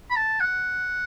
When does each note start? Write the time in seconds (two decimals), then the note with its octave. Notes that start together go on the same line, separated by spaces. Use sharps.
0.11 B5
0.16 A5
0.40 F#5